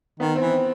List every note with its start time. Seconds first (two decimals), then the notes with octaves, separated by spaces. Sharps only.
0.20 D#3 B3
0.36 E3 C4